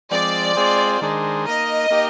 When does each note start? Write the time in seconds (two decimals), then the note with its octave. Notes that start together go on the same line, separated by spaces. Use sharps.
0.11 F3 G#3 C4 D5
0.56 G#3 C4 F4 G#4 C5
1.01 D#3 G#3 D4 G#4 C5
1.46 A#3 D#4 A#4 D#5
1.90 A#3 D#4 G4 A#4